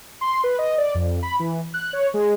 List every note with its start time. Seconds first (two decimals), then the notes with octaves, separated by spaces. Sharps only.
0.21 C6
0.44 B4
0.59 D#5
0.78 D5
0.95 F2
1.23 B5
1.40 E3
1.74 F#6
1.93 C#5
2.14 G#3